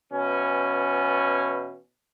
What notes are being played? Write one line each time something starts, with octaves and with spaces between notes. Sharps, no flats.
B2 E3 C#4